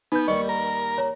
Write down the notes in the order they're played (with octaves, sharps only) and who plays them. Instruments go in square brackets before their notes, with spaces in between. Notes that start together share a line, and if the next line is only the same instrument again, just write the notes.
[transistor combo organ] B3 [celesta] D#4 B4 G6
[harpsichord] D#2 G3 [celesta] D#5 [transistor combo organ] C#6
[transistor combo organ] A#4
[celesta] C#5 A#5